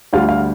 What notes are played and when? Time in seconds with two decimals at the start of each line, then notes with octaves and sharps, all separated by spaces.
0.13 D2 D3 G3 F4 F5
0.29 F5